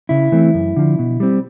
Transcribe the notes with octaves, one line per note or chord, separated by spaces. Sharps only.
C#3 E4
E3 A3 C4
F#2
D3 F3
B2
G3 C4